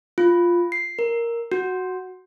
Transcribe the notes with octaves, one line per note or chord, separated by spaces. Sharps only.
F4
C7
A#4
F#4